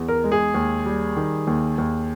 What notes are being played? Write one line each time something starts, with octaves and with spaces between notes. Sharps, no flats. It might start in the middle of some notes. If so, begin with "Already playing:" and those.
Already playing: E2
A#4
G#3
G#4
D#2
G3
D#3
D#2
D#2